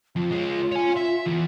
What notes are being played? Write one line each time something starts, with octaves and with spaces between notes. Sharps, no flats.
F2 F4
G#3 C#4
C#5 G#5
E5
E2 E3